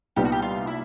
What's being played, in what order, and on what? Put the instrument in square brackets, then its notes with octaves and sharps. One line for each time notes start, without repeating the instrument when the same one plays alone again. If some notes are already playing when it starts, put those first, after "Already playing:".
[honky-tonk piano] C2 A#2 G3 B3 D#4 [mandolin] G4
[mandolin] F#4
G4
F4
E4